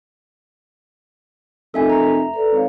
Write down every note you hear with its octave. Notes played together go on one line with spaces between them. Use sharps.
F1 A4 A#4 D#5 E5 G#5
A#5
E5
A4 B4 D5
G#1 C5 C#5 F5